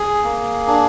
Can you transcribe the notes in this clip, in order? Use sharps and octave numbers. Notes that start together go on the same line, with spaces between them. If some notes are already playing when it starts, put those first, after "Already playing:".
Already playing: G#4
A#3
D4